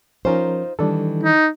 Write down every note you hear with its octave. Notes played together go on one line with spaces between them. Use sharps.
F3 C#4 D#4 F4 A#4 C5
D#3 E3 G3 D4 A4
D#4